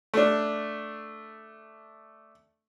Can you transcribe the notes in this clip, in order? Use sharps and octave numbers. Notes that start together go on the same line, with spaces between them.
A3 D4